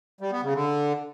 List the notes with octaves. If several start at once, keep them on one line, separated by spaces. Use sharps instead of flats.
G3
B3
C#3
D3